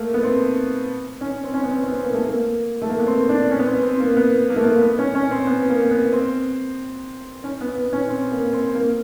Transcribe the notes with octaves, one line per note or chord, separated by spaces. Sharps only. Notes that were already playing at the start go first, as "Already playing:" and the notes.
Already playing: A3 A#3
B3
C4
C#4
C4
C#4
B3
C4
C4
B3
A#3
A3
A#3
A3
A#3
B3
C4
D4
C#4
B3
C4
C4
A#3
B3
A#3
A3
A#3
B3
C#4
C#4
C4
B3
A#3
B3
C4
C#4
B3
B3
C#4
C4
A#3
C4
A#3